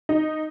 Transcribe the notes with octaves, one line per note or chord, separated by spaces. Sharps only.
D#4